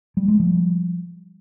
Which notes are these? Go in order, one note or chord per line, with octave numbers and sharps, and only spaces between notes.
G3
G#3
F3 G3